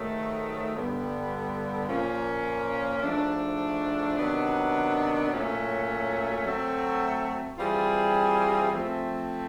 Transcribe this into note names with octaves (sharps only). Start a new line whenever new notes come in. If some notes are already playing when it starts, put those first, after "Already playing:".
Already playing: G#2 D#3 F#3 A3
G2 D3 G3 B3
A#2 F3 A#3 C#4
G#2 F3 A3 D4
C3 D#3 F#3 B3 D4
A#2 F#3 A3 C#4
F#3 A3 C4
E3 G3 C4 F4 G#4
F3 A3 C4